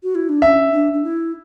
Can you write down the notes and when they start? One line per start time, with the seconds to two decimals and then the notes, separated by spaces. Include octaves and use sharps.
0.03 F#4
0.15 E4
0.29 D4
0.42 C#4 E5
0.72 D4
0.93 D4
1.04 E4